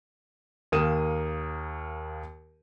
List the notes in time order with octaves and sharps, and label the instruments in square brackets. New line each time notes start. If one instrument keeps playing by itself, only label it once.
[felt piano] D#2 A#3 A#4 D#6 D#7 E7